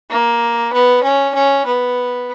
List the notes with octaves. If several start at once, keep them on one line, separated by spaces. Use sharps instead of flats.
A#3
B3
C#4
C#4
B3